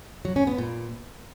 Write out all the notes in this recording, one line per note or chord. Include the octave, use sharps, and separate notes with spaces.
F#3
C#4
B3
A#2